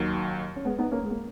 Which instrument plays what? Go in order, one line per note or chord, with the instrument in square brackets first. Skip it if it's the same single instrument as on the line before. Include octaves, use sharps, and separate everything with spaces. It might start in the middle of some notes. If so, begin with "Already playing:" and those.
Already playing: [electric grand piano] D#2 D#3 F#3
[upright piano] C#4
G#3 B3
B3 D#4
A#3 C#4
G#3
A#3